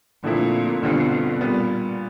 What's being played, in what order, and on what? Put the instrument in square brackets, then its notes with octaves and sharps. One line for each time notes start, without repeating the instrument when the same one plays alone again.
[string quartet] A#2 [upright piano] D3 F3 A3 C4 E4
[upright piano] G2 D3 G3 C4 F4 [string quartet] B2
[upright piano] A#2 G3 B3